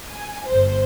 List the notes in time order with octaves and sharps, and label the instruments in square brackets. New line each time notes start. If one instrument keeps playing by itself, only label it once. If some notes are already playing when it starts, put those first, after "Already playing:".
[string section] G#5
G1 C5